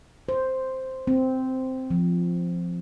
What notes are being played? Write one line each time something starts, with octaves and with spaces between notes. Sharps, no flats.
C5
C4
F3